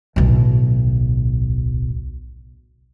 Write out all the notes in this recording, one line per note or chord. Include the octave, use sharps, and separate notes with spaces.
D1 B1